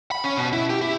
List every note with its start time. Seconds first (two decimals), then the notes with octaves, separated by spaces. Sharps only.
0.11 B5
0.24 C#4
0.37 B2
0.53 E4
0.70 G4
0.81 E4